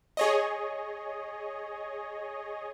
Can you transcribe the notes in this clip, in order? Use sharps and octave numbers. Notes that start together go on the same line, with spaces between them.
G#4 C#5 D#5